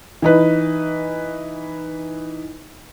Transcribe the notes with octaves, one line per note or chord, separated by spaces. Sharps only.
E3 D#4 B4